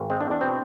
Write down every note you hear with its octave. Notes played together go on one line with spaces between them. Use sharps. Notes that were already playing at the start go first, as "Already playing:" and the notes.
Already playing: G#1
G#3 C4
D4
E2
D4
B2 C4